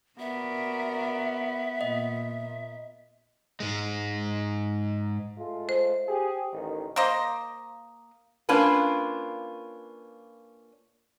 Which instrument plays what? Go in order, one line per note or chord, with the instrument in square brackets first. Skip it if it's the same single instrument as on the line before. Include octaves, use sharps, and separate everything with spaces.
[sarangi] B3 [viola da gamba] F#4 A#4 D5 [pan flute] E5
[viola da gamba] A#2 [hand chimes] D#5
[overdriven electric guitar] G#2 G#3
[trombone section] G#3 A3 F4
[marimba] C5
[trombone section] G4 G#4
A1 D#3
[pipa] A#3 C5 D#5
[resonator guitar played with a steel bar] A#3 C#4 D4 F4 B4